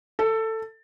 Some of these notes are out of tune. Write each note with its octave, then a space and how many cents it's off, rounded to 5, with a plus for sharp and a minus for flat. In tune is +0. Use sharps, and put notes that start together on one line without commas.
A4 +15